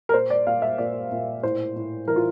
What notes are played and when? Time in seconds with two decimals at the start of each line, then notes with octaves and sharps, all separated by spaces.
0.09 A#4
0.13 A#2 C5
0.30 D5
0.46 A#2 F5
0.62 E5
0.78 A#2 D5
1.12 A#2
1.43 A2 C5
1.76 A2
2.08 E3 A#4
2.16 F4